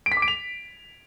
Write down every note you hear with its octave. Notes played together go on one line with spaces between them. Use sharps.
D7
B6
D6
D7
F7